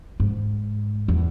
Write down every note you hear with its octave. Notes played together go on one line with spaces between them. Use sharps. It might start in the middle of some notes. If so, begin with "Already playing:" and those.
G#2
E2